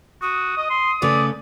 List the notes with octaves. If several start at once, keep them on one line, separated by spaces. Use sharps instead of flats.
F#4 D#6
D#5
C6
C#3 A3 B4 D5